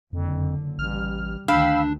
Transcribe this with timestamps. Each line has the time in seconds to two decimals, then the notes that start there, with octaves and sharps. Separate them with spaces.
0.13 F#1 F2 D3
0.79 A1 G3 F6
1.48 D2 D#3 D4 F5 G5 B5 E6